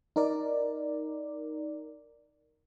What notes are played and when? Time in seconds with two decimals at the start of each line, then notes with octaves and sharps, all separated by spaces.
0.16 D#4 A#4 D5